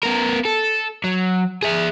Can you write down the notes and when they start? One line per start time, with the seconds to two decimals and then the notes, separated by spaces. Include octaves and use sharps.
0.03 B3 A#4
0.45 A4
1.04 F#3
1.62 G#4 E5